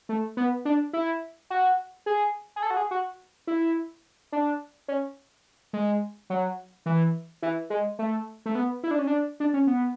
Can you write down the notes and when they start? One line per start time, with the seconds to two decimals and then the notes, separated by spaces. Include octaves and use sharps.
0.09 A3
0.37 B3
0.65 D4
0.93 E4
1.50 F#4
2.06 G#4
2.56 G#4
2.63 A4
2.70 F#4
2.77 G#4
2.91 F#4
3.47 E4
4.32 D4
4.88 C#4
5.73 G#3
6.30 F#3
6.86 E3
7.42 E3
7.70 G#3
7.99 A3
8.46 A3
8.55 B3
8.83 E4
8.91 D4
8.99 C#4
9.07 D4
9.40 D4
9.54 C#4
9.67 B3